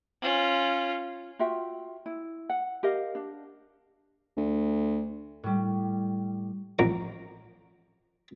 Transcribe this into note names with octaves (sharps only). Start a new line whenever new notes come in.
C#4 F4
F4 F#4 E5 G5
E4
F#5
G4 A#4 D#5 F5
D4
D2
A2 G3
A1 F2 A#5 D6